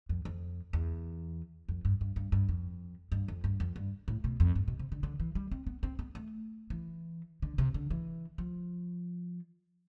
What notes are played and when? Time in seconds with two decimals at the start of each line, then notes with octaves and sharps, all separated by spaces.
0.09 F2
0.25 F2
0.73 E2
1.69 F2
1.85 G2
2.01 G2
2.16 G2
2.32 G2
2.49 F2
3.12 G2
3.28 F2
3.44 G2
3.60 F2
3.76 G2
4.08 A2
4.24 B2
4.40 F2
4.55 G2
4.68 B2
4.79 C3
4.92 D3
5.03 D3
5.20 E3
5.35 G3
5.51 C4
5.67 B3
5.83 C4
5.99 B3
6.15 A3
6.70 E3
7.42 D3
7.58 C3
7.74 D3
7.90 E3
8.38 F3